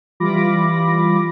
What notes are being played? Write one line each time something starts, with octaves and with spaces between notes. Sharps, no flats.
E3 G3 F4 B5 D6 A#6